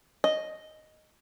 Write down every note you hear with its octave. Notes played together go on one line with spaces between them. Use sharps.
D#5